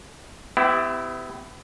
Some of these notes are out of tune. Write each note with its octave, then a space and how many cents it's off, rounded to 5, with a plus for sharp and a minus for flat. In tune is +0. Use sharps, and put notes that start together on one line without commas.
B3 +45 E4 +0 G4 +0